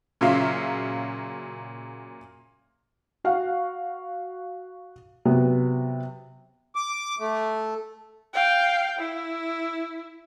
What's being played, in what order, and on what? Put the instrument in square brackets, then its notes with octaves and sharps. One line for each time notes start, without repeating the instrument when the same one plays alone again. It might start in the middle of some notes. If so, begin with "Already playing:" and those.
[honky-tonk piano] A#2 C#3 F#3 E5 F5
[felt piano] F#4 F5 F#5
C3 F#3 B3
[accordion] D6
A3
[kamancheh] F5 G5
E4